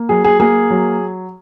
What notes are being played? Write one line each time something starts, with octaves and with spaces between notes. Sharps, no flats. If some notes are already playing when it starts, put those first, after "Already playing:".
Already playing: A#3
F#3 G#4
G#4
A#3 G#4
F#3